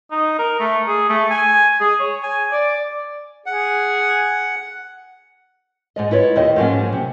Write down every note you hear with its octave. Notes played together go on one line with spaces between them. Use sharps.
D#4
A#4
A3
G#4
A3
G#5
G#4
C#5
G#5
D5
G#4 F#5
G#2 G#3 D#5
E4 F4 B4 C#5 D#5
D#2 C5 D#5
G#2 F3 F#3 G#3 A#3 C#4
C3